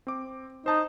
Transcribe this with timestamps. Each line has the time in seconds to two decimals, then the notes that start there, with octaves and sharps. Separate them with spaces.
0.07 C4 D6
0.66 D#4 C5 A5